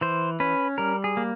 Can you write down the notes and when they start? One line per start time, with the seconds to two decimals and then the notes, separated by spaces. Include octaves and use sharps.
0.01 E3 C5
0.40 C#4 B4
0.78 G3 A#4
1.04 G#4
1.17 A#3